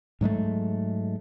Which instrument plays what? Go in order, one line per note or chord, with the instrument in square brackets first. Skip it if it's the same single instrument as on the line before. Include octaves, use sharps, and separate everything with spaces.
[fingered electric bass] G#2 F#3 G#3 A3